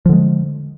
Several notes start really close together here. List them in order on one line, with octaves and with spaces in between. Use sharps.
F3 D3 G#3